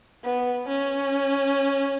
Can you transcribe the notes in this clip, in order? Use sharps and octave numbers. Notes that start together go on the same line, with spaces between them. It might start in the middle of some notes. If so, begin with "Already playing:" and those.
B3
C#4